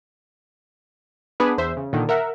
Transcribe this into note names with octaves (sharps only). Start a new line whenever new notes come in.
B3 D4 G#4 B4
E2 C5 E5
C#3
A#2 D3 D#3
A#4 E5 F#5